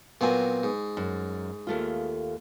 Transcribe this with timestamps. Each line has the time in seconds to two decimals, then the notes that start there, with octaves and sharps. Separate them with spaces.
0.21 A#2 F#3 B3 C4 G#5
0.63 G#2
0.97 F#2
1.67 D#2 A3 F4